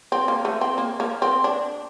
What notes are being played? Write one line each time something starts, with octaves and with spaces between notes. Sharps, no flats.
C4
A#3
A3
C4
A#3
A#3
C4
D4